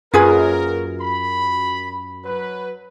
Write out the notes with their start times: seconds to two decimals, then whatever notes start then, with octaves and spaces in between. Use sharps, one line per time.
0.14 F#2 A#3 F4 F#4 G#4 A#4 B4
1.01 B5
2.25 F#3 B4